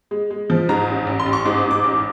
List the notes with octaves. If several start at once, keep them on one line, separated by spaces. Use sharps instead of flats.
G#3
G#3
F3
G#2 A#5
A1
A1
C6
A1
C#6
G#2 D6
G#2
D6
A1